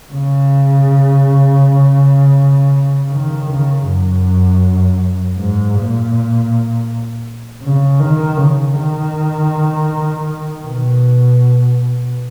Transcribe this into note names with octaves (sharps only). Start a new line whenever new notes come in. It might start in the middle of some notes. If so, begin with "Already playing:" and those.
C#3
D#3
C#3
F#2
G#2
A#2
C#3
D#3
C#3
D#3
B2